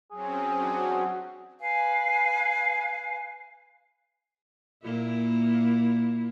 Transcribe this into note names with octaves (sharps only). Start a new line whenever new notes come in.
F#3 C4 C#4 G#4
D4 F#4
B4 F5 G#5
A#2 A#3 E4